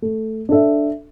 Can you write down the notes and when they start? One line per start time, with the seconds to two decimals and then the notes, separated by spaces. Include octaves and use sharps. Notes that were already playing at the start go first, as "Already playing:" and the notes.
0.02 A3
0.49 D4 A4 E5